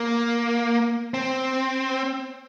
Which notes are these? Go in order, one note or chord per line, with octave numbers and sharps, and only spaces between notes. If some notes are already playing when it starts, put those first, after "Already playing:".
Already playing: A#3
C4